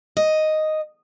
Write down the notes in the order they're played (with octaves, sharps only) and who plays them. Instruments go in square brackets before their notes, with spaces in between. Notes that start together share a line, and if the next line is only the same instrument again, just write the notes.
[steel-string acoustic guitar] D#5